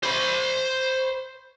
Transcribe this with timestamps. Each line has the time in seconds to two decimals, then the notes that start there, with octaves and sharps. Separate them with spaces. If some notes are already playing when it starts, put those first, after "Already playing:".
0.03 C5 B5